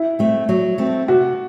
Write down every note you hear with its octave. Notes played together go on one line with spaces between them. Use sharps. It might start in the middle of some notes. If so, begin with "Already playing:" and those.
Already playing: E4
A3 C4
F#3
A3 C4
C3 F#4